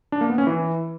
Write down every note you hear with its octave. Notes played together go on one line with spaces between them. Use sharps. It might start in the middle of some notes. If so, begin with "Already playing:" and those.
D4
A#3
B3
C#4
E3